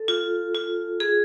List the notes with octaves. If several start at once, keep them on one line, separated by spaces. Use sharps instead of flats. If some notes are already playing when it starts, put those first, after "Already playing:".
Already playing: A4
F4
F4
G#4